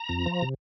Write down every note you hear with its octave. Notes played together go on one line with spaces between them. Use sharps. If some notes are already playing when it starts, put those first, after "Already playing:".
Already playing: A#5
F2
F3
C3